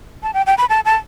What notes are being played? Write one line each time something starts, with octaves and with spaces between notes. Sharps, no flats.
A5
G5
G5
B5
A5
A5